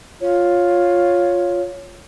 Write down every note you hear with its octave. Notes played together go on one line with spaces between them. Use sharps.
F4 C#5